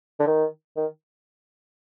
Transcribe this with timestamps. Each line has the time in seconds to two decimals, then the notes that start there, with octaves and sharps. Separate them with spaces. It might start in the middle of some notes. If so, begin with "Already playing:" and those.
0.19 D3
0.27 D#3
0.76 D#3